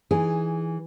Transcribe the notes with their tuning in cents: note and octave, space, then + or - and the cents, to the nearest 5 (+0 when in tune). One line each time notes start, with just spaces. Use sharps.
E3 +0 D#4 +0 G#4 +0